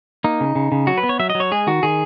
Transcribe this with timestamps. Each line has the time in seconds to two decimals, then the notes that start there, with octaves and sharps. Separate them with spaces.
0.24 A#3 D#4
0.41 C#3
0.55 C#3
0.72 C#3
0.87 F#3 F#4
0.98 B4
1.03 B3
1.09 C#5
1.19 F#3 E5
1.30 D#5
1.35 F#3
1.40 C#5
1.51 G#3 G#4
1.67 D#3 F#4
1.83 D#3 G#4